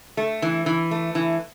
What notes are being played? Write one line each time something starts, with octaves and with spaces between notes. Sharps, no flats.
A3
E3
E3
A3
E3